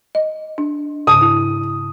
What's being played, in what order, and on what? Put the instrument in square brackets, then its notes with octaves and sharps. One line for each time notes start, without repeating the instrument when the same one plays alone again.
[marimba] D#5
D4
[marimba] G#2 C#3 [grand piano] D#6
[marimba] E4